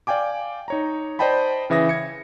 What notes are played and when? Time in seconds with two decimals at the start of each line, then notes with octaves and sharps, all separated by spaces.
0.07 D5 F5 G5 G#5 D6
0.68 D#4 C#5 A#5
1.19 C5 D5 D#5 G5 A5 B5
1.70 C#3 E3 E5 D#6 A#6
1.89 G#6 C#7